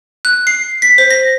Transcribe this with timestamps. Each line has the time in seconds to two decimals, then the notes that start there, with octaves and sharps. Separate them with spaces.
0.25 F#6
0.47 C7
0.82 B6
0.98 C5
1.11 A#6